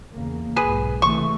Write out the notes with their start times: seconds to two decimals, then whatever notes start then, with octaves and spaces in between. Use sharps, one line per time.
0.12 E2 C#3 A#3
0.56 B1 G#2 G#4 B4
1.02 C3 E3 A3 C#6